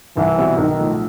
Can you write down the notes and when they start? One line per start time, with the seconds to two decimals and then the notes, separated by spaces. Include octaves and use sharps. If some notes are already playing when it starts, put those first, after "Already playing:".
0.17 C2 E3
0.37 B2 G3 C4 E4
0.57 B1 D#3
0.78 A2 F3